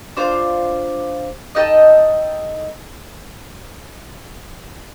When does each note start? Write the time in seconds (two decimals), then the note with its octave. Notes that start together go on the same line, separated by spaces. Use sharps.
0.16 D4 F4 C5
1.55 D#4 A4 D#5 G5